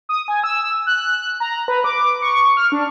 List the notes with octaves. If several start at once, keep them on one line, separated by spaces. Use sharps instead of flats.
D#6
G#5
E6
F#6
A#5
B4
D6
C#6
F6
D4